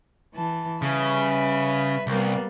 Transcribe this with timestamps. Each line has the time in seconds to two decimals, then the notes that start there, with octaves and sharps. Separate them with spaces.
0.33 E3 A5
0.82 C#3 G3 B4 E5
2.07 C2 G3 A#3 B3